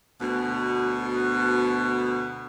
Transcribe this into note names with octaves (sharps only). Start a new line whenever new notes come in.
D2 B2